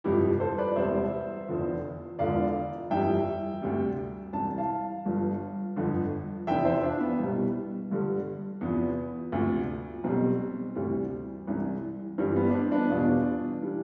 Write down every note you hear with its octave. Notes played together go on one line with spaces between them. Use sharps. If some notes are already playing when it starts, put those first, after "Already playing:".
G1 F2 C3 F3 E4 G4
A4 C5
B4 D5
D5
E1 E2 C3 G3 C5 E5
F1 E2 D3 F3
E1 E2 D3 F3 D5 F5
G1 F2 E3 G3 E5 G5
D2 C3 G3
C2 C3 E3 A5
F5 A5
G1 G2 F3
G1 F2 D3 F3
F1 E2 C3 E3 E5 G5
C5 E5
D4 F4
B3
C2 B2 G3
G1 G2 D3 G3
E2 C3 F3 B3
D2 C3 F3
B1 B2 G3 C4
D2 C3 E3 G3
C2 C3 E3
G1 G2 E3 G3 C4
B3
D4
C4
B3 D4
E2 B2 G3 D4 F4
E3 G3